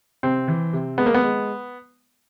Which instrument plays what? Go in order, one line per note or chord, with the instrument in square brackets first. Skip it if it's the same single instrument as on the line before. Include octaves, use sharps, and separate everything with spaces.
[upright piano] C3 [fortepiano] C4
[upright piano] E3
C3
[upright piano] G#3 [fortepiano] B3
[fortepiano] A#3
B3
[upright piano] G#3